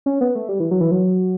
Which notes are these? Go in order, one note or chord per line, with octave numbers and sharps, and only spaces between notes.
C#4
B3
A3
G3
E3
F#3
E3
F#3